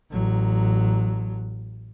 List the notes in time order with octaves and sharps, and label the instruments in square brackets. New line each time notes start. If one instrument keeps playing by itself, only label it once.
[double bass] A1 F#3